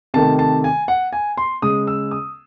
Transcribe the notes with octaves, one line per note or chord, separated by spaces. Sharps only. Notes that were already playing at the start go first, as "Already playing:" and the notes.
C3 D#3 A3 A5
A5
G#5
F#5
G#5
C6
C#3 G#3 D#6
E6
D#6